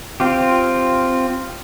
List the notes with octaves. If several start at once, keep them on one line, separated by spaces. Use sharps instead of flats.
C4 F4 G4